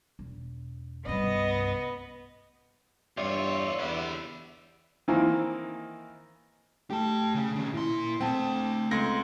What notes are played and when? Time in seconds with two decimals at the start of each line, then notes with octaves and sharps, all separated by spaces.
0.19 E1
1.06 C2 G2 B3 D#5
3.17 E2 G2 F4 G4 C#5 D5 E5
3.79 E2 D3 B3 G4
5.08 D#3 E3 A#3 C4
6.90 A3 G4 G5 A5
7.34 C#3 C#4
7.56 D#3 C#4
7.74 A#2 E4 C6
8.21 A3 C4 F#5 G5 A5
8.91 C#2 C4 A4 C6 A#6